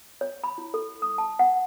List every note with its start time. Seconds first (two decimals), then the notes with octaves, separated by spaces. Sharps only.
0.21 C#5
0.44 B5
0.58 E4
0.74 A4
1.02 D#6
1.18 A5
1.39 F#5